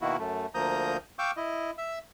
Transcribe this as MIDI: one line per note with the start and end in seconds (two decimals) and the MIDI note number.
0.01 0.16 47
0.01 0.16 51
0.01 0.16 58
0.01 0.16 64
0.01 0.16 66
0.18 0.46 42
0.18 0.46 57
0.54 0.97 38
0.54 0.97 53
0.54 0.97 58
0.54 0.97 82
0.54 0.97 87
0.54 0.97 91
1.19 1.31 77
1.19 1.31 79
1.19 1.31 85
1.19 1.31 86
1.19 1.31 88
1.19 1.31 91
1.37 1.71 64
1.37 1.71 75
1.78 1.99 76
1.78 1.99 88